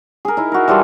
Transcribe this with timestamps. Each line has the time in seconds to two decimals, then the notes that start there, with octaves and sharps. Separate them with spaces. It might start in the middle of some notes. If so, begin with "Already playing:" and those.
0.25 G#4 A#4
0.37 D#4 E4
0.52 F#4 A#4
0.68 E3 G3 F4 A4